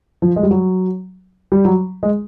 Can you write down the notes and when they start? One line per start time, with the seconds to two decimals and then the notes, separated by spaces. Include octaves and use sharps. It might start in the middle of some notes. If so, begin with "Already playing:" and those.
0.22 F3
0.36 G#3
0.43 G3
0.51 F#3
1.52 G3
1.65 F#3
2.03 G#3